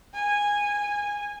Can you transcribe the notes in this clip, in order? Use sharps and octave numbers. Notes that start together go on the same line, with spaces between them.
G#5